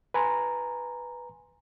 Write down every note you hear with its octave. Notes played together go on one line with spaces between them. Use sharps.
B4 G#5 A#5 C6